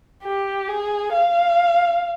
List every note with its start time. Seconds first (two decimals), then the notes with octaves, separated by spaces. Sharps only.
0.23 G4
0.68 G#4
1.13 F5